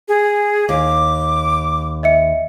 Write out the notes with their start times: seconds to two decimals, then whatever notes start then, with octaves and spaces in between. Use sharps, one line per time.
0.08 G#4
0.69 D#2 D6
2.03 D#5 E5 C#7